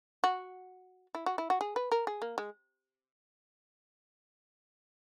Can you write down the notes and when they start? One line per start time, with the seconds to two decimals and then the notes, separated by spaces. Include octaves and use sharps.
0.24 F#4
1.15 E4
1.26 F#4
1.38 E4
1.50 F#4
1.61 G#4
1.76 B4
1.92 A#4
2.07 G#4
2.22 A#3
2.38 G#3